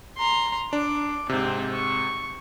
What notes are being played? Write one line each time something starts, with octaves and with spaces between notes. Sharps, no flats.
A#5 C6
D4 D6
G#2 C3 C4
C#6